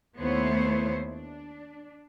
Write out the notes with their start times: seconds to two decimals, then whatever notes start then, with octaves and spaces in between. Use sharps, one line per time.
0.18 D#2 A3 B3 E4 C5 C#5
1.10 D4